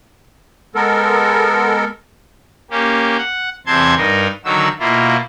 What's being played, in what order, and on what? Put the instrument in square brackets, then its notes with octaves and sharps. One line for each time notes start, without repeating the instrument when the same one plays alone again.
[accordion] G#3 B3 A4 A#4
[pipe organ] A#3 C#4 G4
F#5
E2 C3 C4 A5 C6 G#6
G2 D#4 A#4
D3 D#3 F#3 F#4 E6
B2 A#3 E4 F4